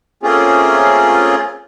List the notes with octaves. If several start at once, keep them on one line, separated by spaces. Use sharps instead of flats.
A3 A#3 C4 C#4 F4 G#4